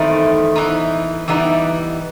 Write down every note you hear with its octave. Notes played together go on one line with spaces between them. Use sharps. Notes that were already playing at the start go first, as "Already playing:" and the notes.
Already playing: E2 D#3 A3 C4 D#4
E3 B3 D#4
E3 G3 B3 D#4